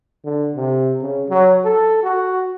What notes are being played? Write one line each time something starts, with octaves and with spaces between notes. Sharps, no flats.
D3
C3
C#3
F#3
A4
F#4